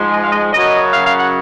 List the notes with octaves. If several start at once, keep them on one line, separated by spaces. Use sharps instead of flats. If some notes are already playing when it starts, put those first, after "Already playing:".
Already playing: G#2 F3 G#3
D#5
F5
D#5
F#2 C#3 F#3 D#5
F5
F5
F#5